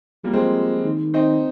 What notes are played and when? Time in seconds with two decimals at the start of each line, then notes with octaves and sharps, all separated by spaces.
0.24 F3 G3 A#3
0.33 G#3 C4
0.84 D#3
1.14 C4 D#4